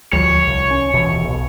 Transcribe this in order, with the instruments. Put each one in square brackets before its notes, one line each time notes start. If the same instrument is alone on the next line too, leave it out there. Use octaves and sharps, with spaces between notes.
[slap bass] D2 F3 G3 [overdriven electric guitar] C#5
[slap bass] C2
C#4
D#1 B2 E3
B1